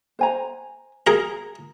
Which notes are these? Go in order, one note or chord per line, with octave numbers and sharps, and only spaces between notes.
C5 G#5 A#5
G#4 A#4 A#5